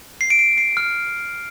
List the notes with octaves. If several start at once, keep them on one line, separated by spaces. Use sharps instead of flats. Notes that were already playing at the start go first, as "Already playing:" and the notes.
C7
D7
C7
C7
F6